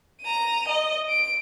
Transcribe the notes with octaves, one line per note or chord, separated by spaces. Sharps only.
A#5 D#7
D#5
D7